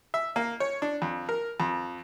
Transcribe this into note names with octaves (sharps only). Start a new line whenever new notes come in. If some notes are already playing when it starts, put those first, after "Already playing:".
E5
A#3
C#5
D4
F2
A#4
F2